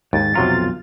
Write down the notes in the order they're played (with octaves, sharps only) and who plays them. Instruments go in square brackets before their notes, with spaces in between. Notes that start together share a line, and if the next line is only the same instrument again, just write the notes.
[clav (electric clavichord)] D#2 [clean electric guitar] G#2 [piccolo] A6
[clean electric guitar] B1 F2 F4 [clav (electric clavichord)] C3 F#3 A#5